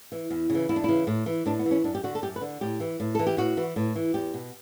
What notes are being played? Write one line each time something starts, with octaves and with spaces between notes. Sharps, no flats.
E3
E2
C#3
E3
E2 E4
D4
C#3 E3 E4
A2
E3
A2 D4
B3
E3
C#4
F#2 D4
G4
D3 F#4
A4
F#2 G4
B4
D3
A2 G4
E3
A2
E3 A4
G4
A2 F#4
E3
A2
E3
E2 G4
B2